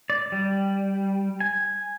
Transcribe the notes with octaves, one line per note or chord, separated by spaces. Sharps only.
D5
G3
G#5